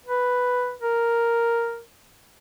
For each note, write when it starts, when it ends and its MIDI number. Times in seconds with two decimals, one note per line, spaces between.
0.06 0.73 71
0.81 1.81 70